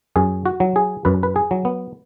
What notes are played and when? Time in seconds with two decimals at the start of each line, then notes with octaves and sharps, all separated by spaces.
0.16 F#2 G#4
0.46 F#4
0.60 F#3
0.76 G#4
1.05 F#2 B4
1.23 B4
1.36 G#4
1.51 F#3
1.65 B3